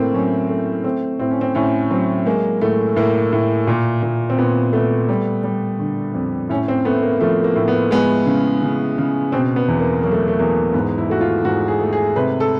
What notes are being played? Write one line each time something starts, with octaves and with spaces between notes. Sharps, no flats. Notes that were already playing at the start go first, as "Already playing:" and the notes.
Already playing: A2 A3 A#3 C4
F#3 C#4
A3
A3 C4
A2 C4
C#4
C4
A2 C#4
F#3 C4
G#3 A#3
A2 A3
A2 A#3
A2
A#2
A#2
C4
A#2 B3
A3 B3
G3
G3
D3
F2
A2 C#4
C4
A3 B3
A#3
F3 A3
A#3
A2
B3
G#3 B3
C#3
C#3
C#3
B2 C4
B3
E2
A#3
F#3 A#3
A3
A3
E2 A#3
G#2 B3
E4
A3 F#4
F4
G#2 F#4
G#4
A3
G#4
C3 B4
A4